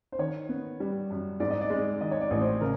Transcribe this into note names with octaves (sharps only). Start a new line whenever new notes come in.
C5
D#3 C#5
B3
G3
F#2
G#2 D5
D#5
D5
G#3
D#3 D#5
C#5
D5
A1
C5
C#3 A#4